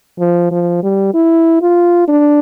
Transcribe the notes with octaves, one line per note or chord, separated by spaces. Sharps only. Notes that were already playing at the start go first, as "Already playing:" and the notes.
F3
F3
G3
E4
F4
D4